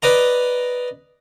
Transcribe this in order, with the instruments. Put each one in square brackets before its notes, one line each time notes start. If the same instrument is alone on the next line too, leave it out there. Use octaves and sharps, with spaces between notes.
[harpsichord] B4 D5 D#5 A#5